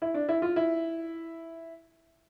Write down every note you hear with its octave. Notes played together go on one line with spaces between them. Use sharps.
E4
D4
E4
F4
E4